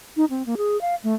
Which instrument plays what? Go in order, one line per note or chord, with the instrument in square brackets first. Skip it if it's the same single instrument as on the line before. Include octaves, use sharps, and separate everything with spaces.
[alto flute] D#4
C4
A#3
G#4
F5
A3